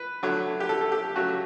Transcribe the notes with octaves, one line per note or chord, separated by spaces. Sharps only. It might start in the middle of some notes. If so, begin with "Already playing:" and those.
Already playing: B4
D3 F#3 A3
G4
A4
A4
G4
C#3 F#3 A3 F#4